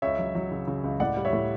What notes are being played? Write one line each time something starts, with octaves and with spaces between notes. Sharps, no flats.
C#2 C#5 E5
F#3
F#3
C#3
C#3
C#2
A2 D5 F#5
G3
C#5 E5
A2